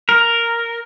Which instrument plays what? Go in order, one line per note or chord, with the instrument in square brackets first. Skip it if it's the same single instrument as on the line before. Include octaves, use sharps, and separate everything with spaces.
[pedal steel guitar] A#4